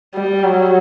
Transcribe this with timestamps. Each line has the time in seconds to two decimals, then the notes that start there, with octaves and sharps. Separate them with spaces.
0.15 G3
0.44 F#3